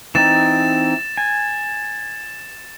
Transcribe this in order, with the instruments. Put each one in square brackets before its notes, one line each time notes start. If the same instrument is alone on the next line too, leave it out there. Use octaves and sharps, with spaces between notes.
[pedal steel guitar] E3 C4 D#4 [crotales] A6 E7
[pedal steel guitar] G#5